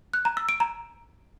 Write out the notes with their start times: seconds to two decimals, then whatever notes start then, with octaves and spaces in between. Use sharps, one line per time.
0.14 F#6
0.25 A#5
0.37 E6
0.49 D7
0.60 A#5